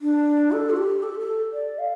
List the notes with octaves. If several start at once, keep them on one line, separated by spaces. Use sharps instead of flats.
D4
A4
F4
G4
A4
A4
D5
F5